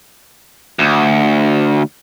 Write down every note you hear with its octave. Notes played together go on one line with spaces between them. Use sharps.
D2